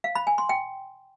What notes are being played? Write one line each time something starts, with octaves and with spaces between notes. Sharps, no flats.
F5
B5
G#5
C6
G5